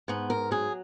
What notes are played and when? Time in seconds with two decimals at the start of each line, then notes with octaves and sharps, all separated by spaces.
0.08 G#2 B3
0.30 A#4
0.51 F#3 G#4